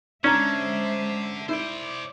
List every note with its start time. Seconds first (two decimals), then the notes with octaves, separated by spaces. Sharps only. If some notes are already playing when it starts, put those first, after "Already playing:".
0.24 D3 G#3 C#4 D4 C5 E5 A#5
1.49 E4 C5 D5